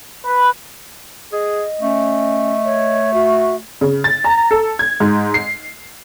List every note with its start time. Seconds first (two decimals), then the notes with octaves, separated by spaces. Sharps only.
0.25 B4
1.33 G#4 D#5
1.81 A3 C#4
2.65 C#5
3.14 F#4 E5
3.81 C#3
4.04 A6
4.24 A#5
4.51 A4
4.79 G#6
5.00 G#2
5.34 C7